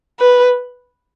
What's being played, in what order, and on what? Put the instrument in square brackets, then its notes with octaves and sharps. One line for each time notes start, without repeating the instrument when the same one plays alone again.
[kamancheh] B4